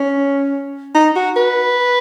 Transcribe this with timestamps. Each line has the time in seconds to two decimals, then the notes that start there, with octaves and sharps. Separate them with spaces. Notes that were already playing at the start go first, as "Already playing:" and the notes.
Already playing: C#4
0.94 D#4
1.15 F#4
1.36 B4